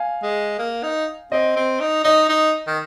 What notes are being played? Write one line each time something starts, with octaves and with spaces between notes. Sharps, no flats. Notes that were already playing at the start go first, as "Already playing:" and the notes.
Already playing: F5 G#5
G#3
A#3
D#4
C4 D#5
C4
D#4
D#4 D#5
D#4
D#3